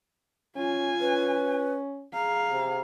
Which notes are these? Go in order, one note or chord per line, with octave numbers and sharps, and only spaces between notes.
C#4 F4 G#5
C#4 B4
G#4 F5 A#5
C3